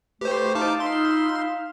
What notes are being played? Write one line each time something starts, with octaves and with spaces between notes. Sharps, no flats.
A3 G4 B4 C5
D#4 F5 A5 D6
D#4 F4 B5 C6 E6